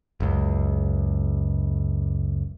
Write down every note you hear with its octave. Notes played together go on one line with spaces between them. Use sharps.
F#1 C#2